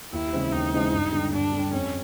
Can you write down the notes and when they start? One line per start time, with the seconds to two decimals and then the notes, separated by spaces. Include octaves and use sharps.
0.12 D#2 E4
0.33 C#3 E3 G#3 C4
0.52 D#2 D#4
0.73 C#3 E3 G#3 C4
0.93 G2
1.13 D3 G3
1.33 G2 D4
1.53 D3 G3
1.73 F2 C#4